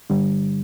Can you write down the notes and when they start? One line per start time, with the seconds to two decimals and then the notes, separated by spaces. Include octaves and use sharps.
0.10 G2 D3 G3